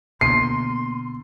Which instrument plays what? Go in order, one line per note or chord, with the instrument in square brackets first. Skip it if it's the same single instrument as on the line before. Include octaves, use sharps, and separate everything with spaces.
[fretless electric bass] B2 D3 [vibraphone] A#3 [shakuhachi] C6 [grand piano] C7